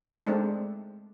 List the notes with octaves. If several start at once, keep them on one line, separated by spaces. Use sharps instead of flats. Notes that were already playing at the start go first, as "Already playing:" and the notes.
G#3 A3 C4 D4 D#4